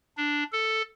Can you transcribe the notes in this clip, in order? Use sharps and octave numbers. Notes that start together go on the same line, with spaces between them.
D4
A4